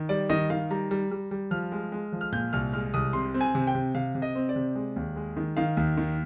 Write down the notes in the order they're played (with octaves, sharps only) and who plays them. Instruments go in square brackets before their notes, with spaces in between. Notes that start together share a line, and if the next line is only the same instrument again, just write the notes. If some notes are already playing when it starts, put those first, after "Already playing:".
Already playing: [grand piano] D#3
G3 D5
D#3 D#5
D#3 F5
G3 A#5
G3
G3
G3
F3 F6
G#3
G#3
F3
F6
A#2 G6
C2 F6
G#3 F6
C2 D#6
C3 C6
C4
G#5
C3
G5
C3
C3 F5
C3
D#5
C4
D5
C3
G#3
D#2
G#3
D#3
D#3 F5
D#2
D#3